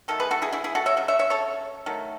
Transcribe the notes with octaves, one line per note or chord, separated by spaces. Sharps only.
D#3 F#3 A3 A4
G#4 B4
F#4 A4
E4 G#4
E4 G#4
E4 G#4
F#4 A4
C#5 E5
C#3 F#3
C#5 E5
C#5 E5
A4 C#5
D#3 F#3 A3